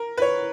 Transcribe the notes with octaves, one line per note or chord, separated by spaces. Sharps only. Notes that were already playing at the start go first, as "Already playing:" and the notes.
Already playing: A#4
B4
C#5